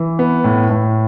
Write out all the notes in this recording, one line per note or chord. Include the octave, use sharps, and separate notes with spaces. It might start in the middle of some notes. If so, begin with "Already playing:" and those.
Already playing: E3
B3
A2
A2